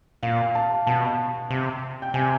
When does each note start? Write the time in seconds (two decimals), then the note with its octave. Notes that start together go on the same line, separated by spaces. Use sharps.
0.23 A#2 F5
0.55 A5
0.86 B2 A5
1.50 C3
2.02 G5
2.14 C3 G#5